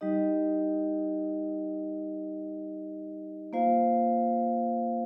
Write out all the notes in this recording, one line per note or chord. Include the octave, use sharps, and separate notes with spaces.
G3 D#4 G4 D#5
A#3 F4 C5 F5